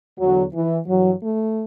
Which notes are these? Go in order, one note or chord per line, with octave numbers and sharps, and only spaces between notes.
E2 D3 F#3
E3
G2 E3 F#3
A3